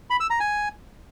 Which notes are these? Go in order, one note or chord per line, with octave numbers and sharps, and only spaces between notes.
B5
E6
A#5
G#5